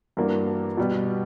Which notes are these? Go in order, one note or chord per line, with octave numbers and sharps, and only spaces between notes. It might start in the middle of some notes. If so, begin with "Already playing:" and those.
G2 E3 A#3 D4 F#4
B2 G3 B3